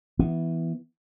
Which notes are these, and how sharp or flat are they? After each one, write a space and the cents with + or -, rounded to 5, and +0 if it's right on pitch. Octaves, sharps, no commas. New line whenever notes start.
E3 +0 B3 +0